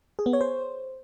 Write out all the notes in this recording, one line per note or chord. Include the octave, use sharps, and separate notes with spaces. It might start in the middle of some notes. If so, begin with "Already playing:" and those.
G#4
B3
C#5
C5